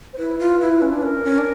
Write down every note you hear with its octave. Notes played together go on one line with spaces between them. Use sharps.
C5
E4 B4
F4
E4
C#4
D4
C#4 A#4
C#4
D4